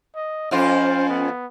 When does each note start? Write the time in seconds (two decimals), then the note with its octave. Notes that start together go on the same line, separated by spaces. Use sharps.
0.15 D#5
0.51 F2 C#4 F4 C5
1.09 B3